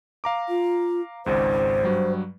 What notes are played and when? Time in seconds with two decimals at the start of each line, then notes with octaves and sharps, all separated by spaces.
0.24 F5 A#5 D6
0.49 F4
1.26 G#1 C#2 G#2 C5
1.83 G2 F#3 G3